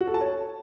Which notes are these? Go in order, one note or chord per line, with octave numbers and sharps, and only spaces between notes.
F#4
A4
A5
C#5